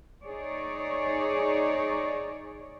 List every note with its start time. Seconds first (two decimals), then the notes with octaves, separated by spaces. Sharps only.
0.25 D#4 G#4 C#5 D5